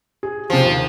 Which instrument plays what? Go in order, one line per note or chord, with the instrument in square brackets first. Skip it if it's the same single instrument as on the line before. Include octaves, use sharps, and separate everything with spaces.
[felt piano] G#4
[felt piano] C3 G#4 [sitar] F3
[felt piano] D#2